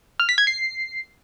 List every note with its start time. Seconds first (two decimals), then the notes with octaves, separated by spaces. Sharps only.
0.20 F6
0.29 B6
0.38 G#6
0.47 C7